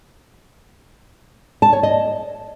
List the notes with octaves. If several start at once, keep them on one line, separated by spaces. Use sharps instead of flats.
A5
C#5
D#5